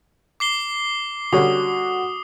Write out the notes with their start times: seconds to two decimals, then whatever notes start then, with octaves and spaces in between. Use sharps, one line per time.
0.40 D6 C7 G7
1.33 D3 G3 C#4 F#4 D#6